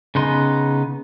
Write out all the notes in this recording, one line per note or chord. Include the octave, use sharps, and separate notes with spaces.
C#3 B3 D#4 C6